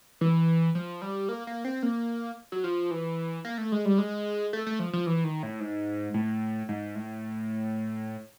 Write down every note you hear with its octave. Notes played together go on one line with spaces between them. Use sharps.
E3
F3
G3
A#3
A#3
C4
A#3
F#3
F3
E3
A#3
A3
G#3
G3
G#3
A3
A3
F3
F3
E3
D#3
A2
G#2
A2
G#2
A2